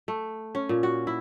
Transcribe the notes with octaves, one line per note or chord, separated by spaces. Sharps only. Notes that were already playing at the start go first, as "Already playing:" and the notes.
A3
C#4
A#2
F#4
E4